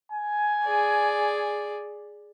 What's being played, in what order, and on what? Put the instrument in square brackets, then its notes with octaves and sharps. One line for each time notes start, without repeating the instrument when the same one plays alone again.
[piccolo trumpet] G#5
[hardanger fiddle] G#4 D5